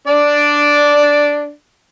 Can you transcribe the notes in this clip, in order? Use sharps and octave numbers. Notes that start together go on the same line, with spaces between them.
D4 D5